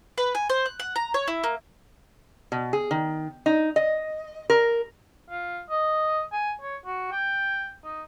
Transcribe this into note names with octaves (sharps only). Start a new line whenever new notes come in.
B4
G#5
C5
F#6
F#5
A#5
C#5
E4
A#3
B2
G#4
D#3
D#4
D#5
A#4
F4
D#5
G#5
C#5
F#4
G5
D#4